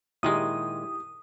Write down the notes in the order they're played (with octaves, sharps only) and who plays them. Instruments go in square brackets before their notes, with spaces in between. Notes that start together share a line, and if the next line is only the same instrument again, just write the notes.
[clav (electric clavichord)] A#2 D#3 G#3 [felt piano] E4 G4 [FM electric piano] D#6